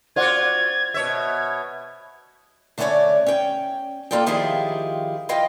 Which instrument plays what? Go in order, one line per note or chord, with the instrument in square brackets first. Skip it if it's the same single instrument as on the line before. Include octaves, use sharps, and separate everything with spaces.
[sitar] F4 F#4 [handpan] C5 D5 F#5 [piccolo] G#6
[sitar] B2 C#5 E5 [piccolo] G#6
[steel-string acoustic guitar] D3 A3 B3 C#4 C#5 D5
C#4 G5
A#3 F4 A4 D5 G5
D#3 F3 E4 F4 G4 G#4
E4 F4 D#5 F5 G5